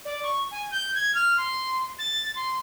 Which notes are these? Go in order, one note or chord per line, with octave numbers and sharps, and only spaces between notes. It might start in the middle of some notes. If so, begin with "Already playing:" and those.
D5
C#6
G#5
G6
G#6
F6
C6
A6
C6